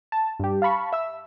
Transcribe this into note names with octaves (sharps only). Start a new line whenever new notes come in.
A5
G2 G4
F5 A5 B5 C#6
E5 E6